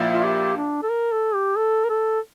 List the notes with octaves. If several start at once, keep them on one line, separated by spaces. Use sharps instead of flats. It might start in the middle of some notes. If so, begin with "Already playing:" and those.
Already playing: A#1 A#2 F3 A#3 E4
F4
G4
D4
A4
A#4
A4
G4
A4
A#4
A4